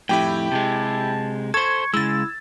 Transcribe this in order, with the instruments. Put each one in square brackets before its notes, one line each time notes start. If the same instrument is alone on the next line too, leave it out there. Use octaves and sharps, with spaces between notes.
[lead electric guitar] F2 A2 [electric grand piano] E4 G4 G5
[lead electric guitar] C3 G#3 [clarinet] A5
[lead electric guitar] A4 C5 [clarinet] C#6 [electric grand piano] G#6
[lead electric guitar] C#3 G#3 [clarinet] E4 [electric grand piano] E6 A6